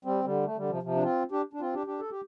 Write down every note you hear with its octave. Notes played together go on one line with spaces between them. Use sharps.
G3 C4
D3 G3
A3
D3 G3
C3 F3
C3 F3
D4
C4 F4
D4 G4
D4
C4 F4
D4 G4
D4 G4
A4
G4